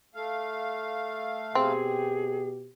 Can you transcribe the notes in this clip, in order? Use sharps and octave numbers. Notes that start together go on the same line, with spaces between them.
A3 F5
B2 C4 G4 G#4